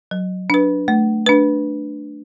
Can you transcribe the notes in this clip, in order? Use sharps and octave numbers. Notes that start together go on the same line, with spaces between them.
F#3
D4 B4
A3
D4 B4